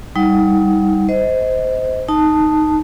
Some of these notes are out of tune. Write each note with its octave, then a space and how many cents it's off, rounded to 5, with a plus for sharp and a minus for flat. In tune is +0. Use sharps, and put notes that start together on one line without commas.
G3 +0 D#4 +30 F#5 +0
C5 -15 D#5 +25
D#4 -5 A5 +0